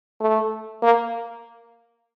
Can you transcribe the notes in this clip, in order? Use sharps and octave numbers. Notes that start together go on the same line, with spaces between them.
A3
A#3